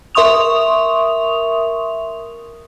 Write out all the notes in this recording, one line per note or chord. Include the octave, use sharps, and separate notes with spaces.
A#4 E5 C6 C#6 D#6 F7